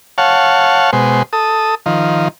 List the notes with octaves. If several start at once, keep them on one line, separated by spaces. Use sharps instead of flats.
C#5 F5 F#5 A5
B2 G#3 C5
A4 D#6
D#3 F3